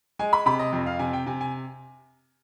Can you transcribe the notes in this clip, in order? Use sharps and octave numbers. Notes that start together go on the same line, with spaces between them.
G#3 G#5
B5
C3 B5
D#5
F2
F5
C3 G#5
G5
C3 G#5
G#5